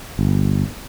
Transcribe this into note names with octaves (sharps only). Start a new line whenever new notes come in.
G1